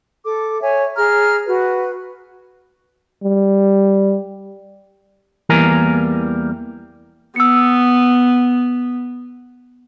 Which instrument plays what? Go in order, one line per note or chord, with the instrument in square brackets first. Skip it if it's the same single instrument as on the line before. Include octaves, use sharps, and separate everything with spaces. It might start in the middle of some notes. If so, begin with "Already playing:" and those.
[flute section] A4 D6
C#5 E5 G#5
G#4 A#5 F6
F#4 B4
[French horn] G3
[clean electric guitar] E2 E3 G3 A#3 A#4 G#5
[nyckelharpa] B3 [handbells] E6 C#7